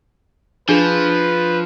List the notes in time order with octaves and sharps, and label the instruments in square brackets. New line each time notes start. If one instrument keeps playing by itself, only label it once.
[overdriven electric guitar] F3 [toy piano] D4 G#4 [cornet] B4